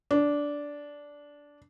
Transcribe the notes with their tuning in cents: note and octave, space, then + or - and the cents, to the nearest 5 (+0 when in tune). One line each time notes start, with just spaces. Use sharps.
D4 -10